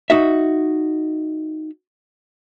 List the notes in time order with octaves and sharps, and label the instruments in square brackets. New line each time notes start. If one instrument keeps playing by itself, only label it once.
[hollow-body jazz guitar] D#4 F#4 E5